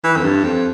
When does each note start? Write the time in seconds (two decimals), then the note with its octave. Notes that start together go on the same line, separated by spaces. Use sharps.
0.04 E3
0.17 F2
0.24 G2
0.44 F2